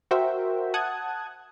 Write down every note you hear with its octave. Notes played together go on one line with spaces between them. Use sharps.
F#4 A#4 C5 E5 G5
F#5 A5 D#6 F#6 G#6